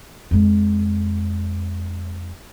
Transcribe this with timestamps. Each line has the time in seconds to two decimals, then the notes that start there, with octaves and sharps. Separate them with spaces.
0.31 F2 G#3